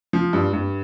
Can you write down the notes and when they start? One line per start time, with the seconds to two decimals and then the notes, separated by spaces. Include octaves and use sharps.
0.13 F3
0.33 G2
0.53 G2